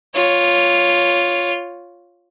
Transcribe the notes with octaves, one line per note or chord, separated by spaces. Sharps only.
F4 C#5